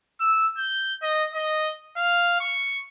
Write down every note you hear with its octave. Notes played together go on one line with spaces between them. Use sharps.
E6
G6
D#5
D#5
F5
C#6